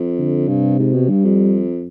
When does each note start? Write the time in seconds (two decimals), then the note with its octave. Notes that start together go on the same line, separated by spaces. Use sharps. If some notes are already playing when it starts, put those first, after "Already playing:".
Already playing: F2
0.18 D3
0.48 G2 C3
0.79 G#2
0.94 B2
1.09 G2 G3
1.25 F2